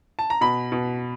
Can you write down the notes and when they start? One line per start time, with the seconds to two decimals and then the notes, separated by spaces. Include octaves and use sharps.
0.19 A5
0.30 A#5
0.41 B2 B5
0.72 B2